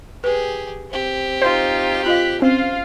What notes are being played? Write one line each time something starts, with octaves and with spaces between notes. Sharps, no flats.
G4 G#4 B4
C4 G4
D#4 F4 C5
F4 D#5 F5 F#6 B6
C4 C#4 F4 C5 F5